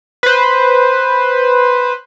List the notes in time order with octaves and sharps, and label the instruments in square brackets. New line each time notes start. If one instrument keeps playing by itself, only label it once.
[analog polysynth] B4 C5